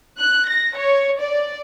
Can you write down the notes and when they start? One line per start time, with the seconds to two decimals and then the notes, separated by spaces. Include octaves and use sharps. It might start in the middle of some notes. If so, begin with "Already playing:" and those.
0.18 F#6
0.46 A#6
0.76 C#5
1.19 D5